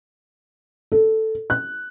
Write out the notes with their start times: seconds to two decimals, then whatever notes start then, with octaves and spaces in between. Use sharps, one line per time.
0.92 A4
1.50 F#6